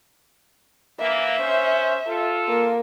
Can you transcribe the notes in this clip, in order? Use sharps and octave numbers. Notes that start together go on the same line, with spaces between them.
E3 A#3 E5
C#4 C5
F4 A4
A#3